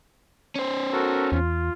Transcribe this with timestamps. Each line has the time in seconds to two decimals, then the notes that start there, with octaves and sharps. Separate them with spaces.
0.56 C#4 C5
0.92 F#4 A4 A#4
1.32 E2 F4